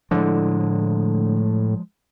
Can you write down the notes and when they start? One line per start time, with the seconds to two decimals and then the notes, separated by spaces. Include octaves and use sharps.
0.11 A2 D3 F3 G#3